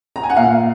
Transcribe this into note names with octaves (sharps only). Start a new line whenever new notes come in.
A#5
G#5
F#5
A#2 F5